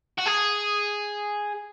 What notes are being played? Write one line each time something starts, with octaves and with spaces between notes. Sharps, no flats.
F#4
G#4